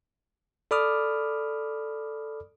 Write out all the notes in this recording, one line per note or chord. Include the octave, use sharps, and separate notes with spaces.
A4 D5 B5 D6 D#6 F6